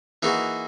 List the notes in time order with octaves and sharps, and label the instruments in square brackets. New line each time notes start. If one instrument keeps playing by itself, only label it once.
[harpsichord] E3 A#3 D#4 F#4 [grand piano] E4 G#4